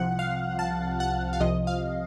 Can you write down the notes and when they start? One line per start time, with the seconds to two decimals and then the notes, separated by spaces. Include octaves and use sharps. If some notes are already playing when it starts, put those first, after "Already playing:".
Already playing: C2 C3 F3 F#5
0.19 F5
0.59 A5
1.00 F#5
1.33 F5
1.40 C2 C3 F3 D#5
1.67 F5